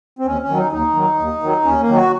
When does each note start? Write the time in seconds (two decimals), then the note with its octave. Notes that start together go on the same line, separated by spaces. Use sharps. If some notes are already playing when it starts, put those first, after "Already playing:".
0.19 C4
0.26 D#2 C#4
0.42 C#4
0.49 D#3 F#3
0.57 D#4
0.72 D#2 D#4
0.95 D#3 F#3
1.19 D#2
1.43 D#3 F#3
1.65 D#2 C#4
1.81 A#3
1.88 D#3 F#3
1.96 F#4